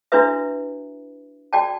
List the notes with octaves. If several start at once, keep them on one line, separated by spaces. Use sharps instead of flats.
D4 E4 F#4 B4 E5
F#4 D5 G5 A5